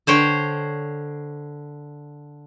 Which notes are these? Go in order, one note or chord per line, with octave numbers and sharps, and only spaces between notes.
D3 C5 C#5 G5